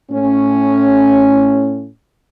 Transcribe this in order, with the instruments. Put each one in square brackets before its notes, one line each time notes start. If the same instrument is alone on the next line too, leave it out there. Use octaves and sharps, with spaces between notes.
[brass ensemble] A2 C#4